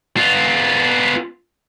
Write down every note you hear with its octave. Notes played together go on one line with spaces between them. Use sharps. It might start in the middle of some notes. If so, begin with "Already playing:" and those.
B3 F4